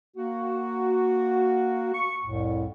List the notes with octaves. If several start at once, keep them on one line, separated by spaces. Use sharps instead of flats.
A#3 F#4
C#6
C2 F2 A2